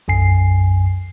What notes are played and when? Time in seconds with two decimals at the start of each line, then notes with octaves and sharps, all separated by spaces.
0.08 B1 F#2 G#5 C7